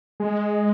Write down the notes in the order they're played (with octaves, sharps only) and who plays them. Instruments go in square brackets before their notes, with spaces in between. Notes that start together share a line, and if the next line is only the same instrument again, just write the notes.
[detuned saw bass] G#3